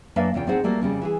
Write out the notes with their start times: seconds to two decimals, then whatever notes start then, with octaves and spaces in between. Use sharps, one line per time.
0.16 F#2 A#3 D4 B4 E5 F5
0.34 E2 C#3 F4 G5
0.47 A2 C4 D#4 G#4 C5 F#5
0.64 G3 A3 A#3 F#4
0.82 F2 C#3 G3 C#4
1.01 E3 G4 G#4